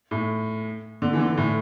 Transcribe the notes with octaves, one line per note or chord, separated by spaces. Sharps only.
A2
D3
E3
D3
A2